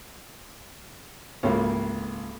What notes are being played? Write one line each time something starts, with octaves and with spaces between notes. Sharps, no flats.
G#1 C#2 A3 A#3 G4 C#5